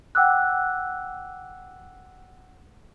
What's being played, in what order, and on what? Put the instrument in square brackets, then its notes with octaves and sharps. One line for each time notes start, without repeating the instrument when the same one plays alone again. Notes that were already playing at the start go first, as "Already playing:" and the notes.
[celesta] F#5 G5 D6 E6 F#6